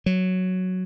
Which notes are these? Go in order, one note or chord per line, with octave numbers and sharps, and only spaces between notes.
F#3